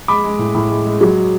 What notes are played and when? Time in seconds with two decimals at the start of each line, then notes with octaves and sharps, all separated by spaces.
0.08 G#3 B5 D6
0.24 G#3
0.39 A2
0.55 A2
0.70 G#3
0.86 G#3
1.01 F#3